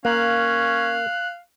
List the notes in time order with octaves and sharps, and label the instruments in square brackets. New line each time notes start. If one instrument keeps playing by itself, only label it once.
[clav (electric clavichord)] A#3 [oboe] C#4 [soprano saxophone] F5 [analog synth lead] F#6